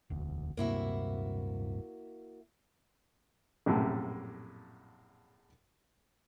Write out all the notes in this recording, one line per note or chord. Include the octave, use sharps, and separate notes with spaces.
E1 D2
D1 G2 C3 A#3 E4 F#4
A#1 F#2 A2 C3 A3